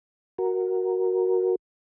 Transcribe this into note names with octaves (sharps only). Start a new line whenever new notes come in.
F#4 A#4